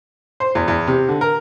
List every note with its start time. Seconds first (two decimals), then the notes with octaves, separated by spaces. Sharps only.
0.40 C5
0.55 E2
0.68 E2
0.87 C3
1.09 D3
1.21 A#4